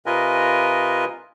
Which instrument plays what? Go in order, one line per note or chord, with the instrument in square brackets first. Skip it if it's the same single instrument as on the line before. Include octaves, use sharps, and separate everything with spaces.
[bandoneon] C3 F4 A#4 B4 D#5 G#5